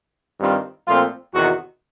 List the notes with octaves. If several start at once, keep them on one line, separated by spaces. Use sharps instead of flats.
G2 D#3 G3 C4 F4
A#2 F3 A3 C4 F4
E2 C3 D#3 F#4